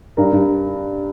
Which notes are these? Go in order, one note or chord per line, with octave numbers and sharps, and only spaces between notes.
G2 A#4
G2